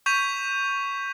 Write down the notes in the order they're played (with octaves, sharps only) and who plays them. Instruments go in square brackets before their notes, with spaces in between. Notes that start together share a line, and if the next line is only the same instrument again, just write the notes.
[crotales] C#6 G6 B6 D#7 F7